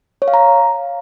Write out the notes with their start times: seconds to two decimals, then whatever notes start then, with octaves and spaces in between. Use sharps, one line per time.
0.22 C#5
0.28 F5
0.34 A#5